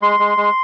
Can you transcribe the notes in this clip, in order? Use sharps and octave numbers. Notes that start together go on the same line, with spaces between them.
G#3 C6
G#3
G#3